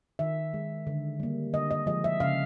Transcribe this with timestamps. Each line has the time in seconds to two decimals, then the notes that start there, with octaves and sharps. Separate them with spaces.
0.19 D#3 E5
0.54 G#3
0.87 D3
1.20 G3 A#3
1.53 D3 D#5
1.71 D#5
1.86 F3 G#3 D#5
2.04 E5
2.20 C#3 F5